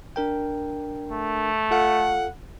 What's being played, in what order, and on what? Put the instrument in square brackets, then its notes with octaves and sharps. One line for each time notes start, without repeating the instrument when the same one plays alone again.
[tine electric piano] D4 A#4 G5
[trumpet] A3
[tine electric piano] F4 A4 F5 [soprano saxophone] F#5